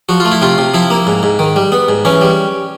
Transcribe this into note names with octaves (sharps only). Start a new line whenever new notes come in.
F3 F#4
A3 F4
E4
C3 F4
C3
F3 E4
A#3
G#2
G#2
D#3
G3
B3
G#2
E3 C#4
G3